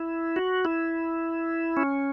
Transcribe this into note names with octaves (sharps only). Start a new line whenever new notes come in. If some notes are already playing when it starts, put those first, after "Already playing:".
Already playing: E4
F#4
E4
C#4